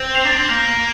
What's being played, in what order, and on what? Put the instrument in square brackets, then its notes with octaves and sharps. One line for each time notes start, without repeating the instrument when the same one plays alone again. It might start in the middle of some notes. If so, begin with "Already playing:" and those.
Already playing: [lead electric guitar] C4
[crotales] C7 F7
[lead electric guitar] D4
C4
[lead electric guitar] A#3 [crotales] C7 F7